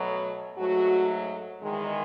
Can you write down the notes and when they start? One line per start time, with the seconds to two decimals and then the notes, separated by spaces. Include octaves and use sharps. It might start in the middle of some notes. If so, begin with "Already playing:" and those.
Already playing: B2 F#3 A3
0.57 G#2 F#3 A3 F#4
1.62 E2 D#3 G#3